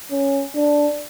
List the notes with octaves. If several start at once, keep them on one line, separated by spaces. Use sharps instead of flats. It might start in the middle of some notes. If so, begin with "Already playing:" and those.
C#4
D4